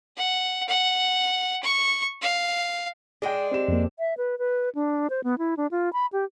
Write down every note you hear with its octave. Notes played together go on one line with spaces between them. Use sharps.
F#5
F#5
C#6
F5
G#3 D4 G#4 G5
C4 G4 E7
F2 A#3
E5
B4
B4
D4
C5
B3
E4
D4
F4
B5
G4